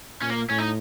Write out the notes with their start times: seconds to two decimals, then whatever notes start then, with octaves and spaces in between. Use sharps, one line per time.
0.21 A#2 C#4
0.30 A#3
0.49 A2 C#4
0.58 D#4